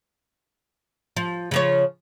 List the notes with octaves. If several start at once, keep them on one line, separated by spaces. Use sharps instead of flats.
F3
C#3 F3 C#5